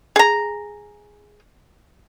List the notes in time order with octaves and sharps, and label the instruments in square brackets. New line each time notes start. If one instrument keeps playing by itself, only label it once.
[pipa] G#4 A#5